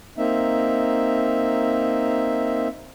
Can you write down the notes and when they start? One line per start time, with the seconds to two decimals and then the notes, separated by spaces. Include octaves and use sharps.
0.18 A#3 C4 D#4 E5